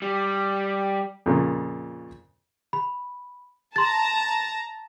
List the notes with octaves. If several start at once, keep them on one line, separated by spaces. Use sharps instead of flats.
G3
F2 A#2 C#3
B5
A5 A#5 C6 A6